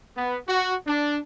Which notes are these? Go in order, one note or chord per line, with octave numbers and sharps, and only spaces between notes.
B3
F#4
D4